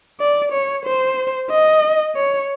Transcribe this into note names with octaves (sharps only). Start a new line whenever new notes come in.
D5
C#5
C5
D#5
C#5